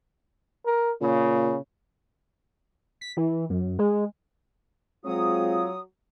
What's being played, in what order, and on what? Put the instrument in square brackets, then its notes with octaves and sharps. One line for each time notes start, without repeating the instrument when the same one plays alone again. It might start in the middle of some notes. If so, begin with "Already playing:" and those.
[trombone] A#4
[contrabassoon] A#2 [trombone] C#3
[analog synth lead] B6
E3
F#2
G#3
[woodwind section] F#3 D#6 [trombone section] G#3 C4 F4